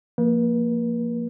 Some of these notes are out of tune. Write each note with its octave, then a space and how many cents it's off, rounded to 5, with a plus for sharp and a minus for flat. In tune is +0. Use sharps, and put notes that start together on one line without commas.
F3 +0 A#3 -5 B4 -40